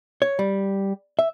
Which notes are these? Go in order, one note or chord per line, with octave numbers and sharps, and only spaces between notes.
C#5
G3
E5